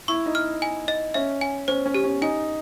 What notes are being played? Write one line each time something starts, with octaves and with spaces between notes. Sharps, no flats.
E4 C#6
D#4
F6
G#5
D#5
C#4 E5
G#5
C#4 C5
C#4
G4
C#4
D#4 G#5